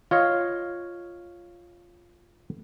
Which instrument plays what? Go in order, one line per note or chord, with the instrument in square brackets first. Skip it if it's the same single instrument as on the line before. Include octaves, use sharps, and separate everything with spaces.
[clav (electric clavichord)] F4 C#5 D#5 F5